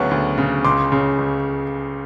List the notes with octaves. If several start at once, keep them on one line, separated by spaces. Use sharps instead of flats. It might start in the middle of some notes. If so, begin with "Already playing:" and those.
Already playing: D2 C#3 F#3 B3 C#6
D2
C#3
C#2 C6 D6
C#3
C#2